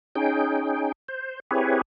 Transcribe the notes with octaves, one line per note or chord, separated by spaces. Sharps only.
C#4 D#4 G#4 G5
C5
C4 E4 G4 G#4 B4 C#5